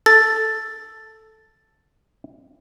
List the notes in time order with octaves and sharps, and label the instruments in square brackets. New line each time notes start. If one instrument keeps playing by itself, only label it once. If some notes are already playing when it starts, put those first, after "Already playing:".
[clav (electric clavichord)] A4 [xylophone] A6